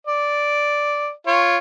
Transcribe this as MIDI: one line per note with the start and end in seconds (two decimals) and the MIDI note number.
0.07 1.11 74
1.27 1.57 65
1.27 1.57 73